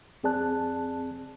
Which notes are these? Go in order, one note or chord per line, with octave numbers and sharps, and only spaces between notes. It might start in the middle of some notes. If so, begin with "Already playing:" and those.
F2 C4 G#4 D5 A5 F#6